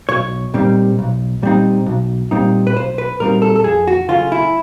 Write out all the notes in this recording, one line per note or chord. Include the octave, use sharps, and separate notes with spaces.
B1 C#5
A#2 G3 C4 D#4
B1
A#2 G3 C4 D#4
B1
A#2 G3 C4 D#4
B4
B1 C5
B4
A#2 G3 C4 D#4 A#4
A4
A4
F2 G#4
F#4
C#3 F#3 A3 C#4 F4
E4